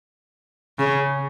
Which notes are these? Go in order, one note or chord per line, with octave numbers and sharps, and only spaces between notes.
C#3